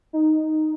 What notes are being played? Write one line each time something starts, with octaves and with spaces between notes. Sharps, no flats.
D#4